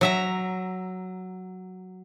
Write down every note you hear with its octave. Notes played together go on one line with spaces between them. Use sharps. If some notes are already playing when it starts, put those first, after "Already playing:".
F#3 E5 A#5